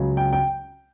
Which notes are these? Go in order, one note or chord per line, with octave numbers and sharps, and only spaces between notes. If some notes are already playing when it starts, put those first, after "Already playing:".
Already playing: C#2 C#3 F#3
G5
G5